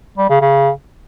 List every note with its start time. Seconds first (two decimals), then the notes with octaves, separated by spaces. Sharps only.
0.18 G3
0.30 C#3
0.41 C#3